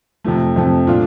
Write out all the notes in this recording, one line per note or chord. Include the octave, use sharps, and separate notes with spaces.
F2 C3 F3 A3
F2 C3 F3 A3
A#2 A3 D4 F4